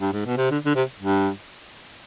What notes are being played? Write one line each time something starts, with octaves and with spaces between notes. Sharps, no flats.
G2
G#2
B2
C3
D3
D3
C3
G2